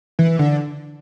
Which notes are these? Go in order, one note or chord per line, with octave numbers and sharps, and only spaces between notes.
E3
D3